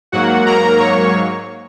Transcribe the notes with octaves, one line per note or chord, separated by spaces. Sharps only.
G#2 F#3 A#3 F#4 F#5
A#4 A#5
C#5 C#6